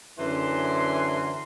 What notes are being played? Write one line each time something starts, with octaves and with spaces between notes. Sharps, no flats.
F#2 D3 E3 C6